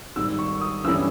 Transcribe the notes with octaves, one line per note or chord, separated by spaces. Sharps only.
G#1 G#2 G3 E6
C#6
D#6
G1 G2 E3 G3 C#4 E6